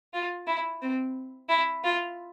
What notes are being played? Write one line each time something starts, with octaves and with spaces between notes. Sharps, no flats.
F4
E4
C4
E4
F4